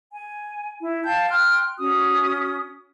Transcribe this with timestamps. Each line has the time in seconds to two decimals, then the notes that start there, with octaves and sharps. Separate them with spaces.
0.13 G#5
0.81 E4
1.04 F5 G5 A5 G6
1.30 G5 C6 F6 F#6
1.79 C#4 F#4 D#6